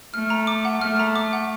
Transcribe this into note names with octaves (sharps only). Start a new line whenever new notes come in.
A3 F6
A#5
D6
F#5
A3 F6
A#5
D6
F#5